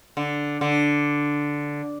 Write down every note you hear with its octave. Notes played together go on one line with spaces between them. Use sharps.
D3
D3